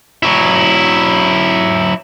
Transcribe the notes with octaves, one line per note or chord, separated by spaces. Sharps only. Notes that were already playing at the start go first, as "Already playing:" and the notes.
F#3 E4